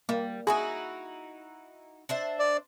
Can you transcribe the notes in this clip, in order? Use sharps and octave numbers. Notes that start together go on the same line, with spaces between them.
G3 A#3
D#4 E4 F#4 G#4
D4 C5 E5
D5